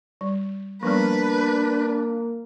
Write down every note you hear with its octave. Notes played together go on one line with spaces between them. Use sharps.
G3
F3 G3 A#3 B3 D4 B4